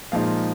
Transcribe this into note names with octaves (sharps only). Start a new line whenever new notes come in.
A#2 F3 G#3 D#4 F5